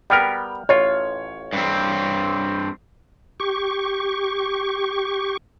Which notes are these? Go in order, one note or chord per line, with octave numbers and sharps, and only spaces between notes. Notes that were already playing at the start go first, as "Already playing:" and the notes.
G3 B3 A#4 G5 F6
A1 F4 C#5
G2 C4
G4 C#6